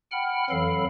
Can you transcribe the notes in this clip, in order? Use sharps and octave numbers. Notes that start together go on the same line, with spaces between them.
F#5 G5 B5 F6
F2 E3 F#3 A4 F5 B5